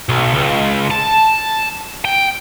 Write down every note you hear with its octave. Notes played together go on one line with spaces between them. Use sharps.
B1
C#2
A5
G5